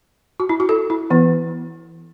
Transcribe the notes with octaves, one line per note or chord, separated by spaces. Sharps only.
F#4
E4
F#4
A4
E4
E3 B3